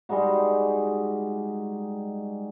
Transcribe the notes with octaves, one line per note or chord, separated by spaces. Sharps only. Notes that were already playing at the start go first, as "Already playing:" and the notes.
G3 G#3 D#4 F#4